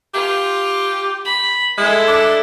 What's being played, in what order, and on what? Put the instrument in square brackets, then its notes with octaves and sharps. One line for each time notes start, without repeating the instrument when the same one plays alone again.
[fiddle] F4 [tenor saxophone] G4
[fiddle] B5
[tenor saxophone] G#3 [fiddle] E4 A4
[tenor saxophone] D4